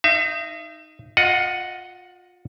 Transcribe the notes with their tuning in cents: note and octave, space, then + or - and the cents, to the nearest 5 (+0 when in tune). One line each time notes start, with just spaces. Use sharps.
D#4 +0 E5 +40
F4 +30 D#5 +0 F#5 +0